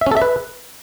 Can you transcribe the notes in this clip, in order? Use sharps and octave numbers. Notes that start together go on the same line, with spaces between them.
E5
C#4
A4
E5
B4